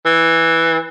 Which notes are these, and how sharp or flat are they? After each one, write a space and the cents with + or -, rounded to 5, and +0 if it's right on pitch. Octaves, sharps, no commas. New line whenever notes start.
E3 +0